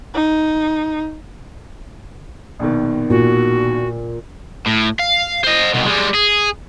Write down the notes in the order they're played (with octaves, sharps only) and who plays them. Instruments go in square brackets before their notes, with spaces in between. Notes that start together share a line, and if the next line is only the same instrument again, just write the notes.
[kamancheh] D#4
[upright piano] A#1 B2 D#3
[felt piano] A#2 [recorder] F#4
[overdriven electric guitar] A2
F5
C5 D#5
C2 B2
G3 G#3
G#4